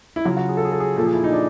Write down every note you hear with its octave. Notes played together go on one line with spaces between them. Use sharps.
E4
C#3 F#3 F4
F#4
G#4
A4
G#4
A4
G#4
A#2 F3 A4
G#4
E4
D#4
D4